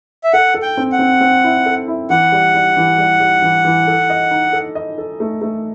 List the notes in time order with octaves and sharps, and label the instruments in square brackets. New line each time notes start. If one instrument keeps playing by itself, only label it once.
[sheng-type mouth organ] E5
[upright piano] A4 [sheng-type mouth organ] F#5
[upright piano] A4
[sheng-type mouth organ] G5
[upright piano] C4
[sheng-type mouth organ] F#5
[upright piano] C4
C4
E4
A4
E4
[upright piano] E3 [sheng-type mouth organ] F#5
[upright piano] G3
G3
E3
G3
G3
E3
E3
A4
D#5
D#4
A4
D#5
A4
A3
A3